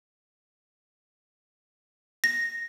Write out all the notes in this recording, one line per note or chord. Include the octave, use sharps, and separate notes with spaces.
A#6